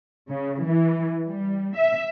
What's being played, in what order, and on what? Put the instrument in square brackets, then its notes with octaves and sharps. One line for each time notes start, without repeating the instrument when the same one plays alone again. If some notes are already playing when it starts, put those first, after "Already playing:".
[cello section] C#3
E3
G3
E5